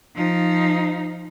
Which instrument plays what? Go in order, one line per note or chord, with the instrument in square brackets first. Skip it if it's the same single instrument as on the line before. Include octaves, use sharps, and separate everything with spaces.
[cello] F3 D#4